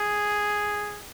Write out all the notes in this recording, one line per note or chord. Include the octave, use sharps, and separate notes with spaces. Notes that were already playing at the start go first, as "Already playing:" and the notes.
Already playing: G#4